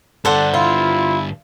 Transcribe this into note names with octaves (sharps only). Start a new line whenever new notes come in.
G2 D3 D4 A4 C5 F#5
E4 F4